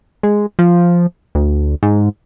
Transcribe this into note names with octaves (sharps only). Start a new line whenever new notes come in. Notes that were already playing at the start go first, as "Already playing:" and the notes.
G#3
F3
D2
G#2